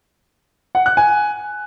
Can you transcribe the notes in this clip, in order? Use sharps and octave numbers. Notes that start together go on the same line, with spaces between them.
F#5
F#6
G#5